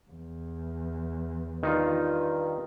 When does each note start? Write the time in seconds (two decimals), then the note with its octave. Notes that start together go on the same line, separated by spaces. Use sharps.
0.11 E2
1.63 G2 D#3 D#4 F4